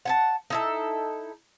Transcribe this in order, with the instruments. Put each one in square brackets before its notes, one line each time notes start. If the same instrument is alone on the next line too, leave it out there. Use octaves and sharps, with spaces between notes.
[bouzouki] F#5 G#5 A5
D#4 E4 A4